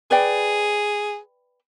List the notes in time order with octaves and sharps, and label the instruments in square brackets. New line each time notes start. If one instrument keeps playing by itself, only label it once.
[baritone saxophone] G#4 [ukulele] B4 D5 G5